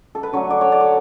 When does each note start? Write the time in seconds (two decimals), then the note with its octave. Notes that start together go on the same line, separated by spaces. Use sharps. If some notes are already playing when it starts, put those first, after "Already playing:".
0.15 A4
0.23 B4
0.33 D3 F#3 A3 C#5
0.50 D5
0.61 C#5
0.72 D5
0.81 C#5